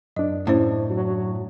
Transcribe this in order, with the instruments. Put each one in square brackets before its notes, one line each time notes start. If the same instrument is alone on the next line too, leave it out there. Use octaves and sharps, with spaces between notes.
[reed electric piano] F#2 D4 [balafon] D#5
[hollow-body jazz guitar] A2 [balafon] C#4 E4 C5
[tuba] F#3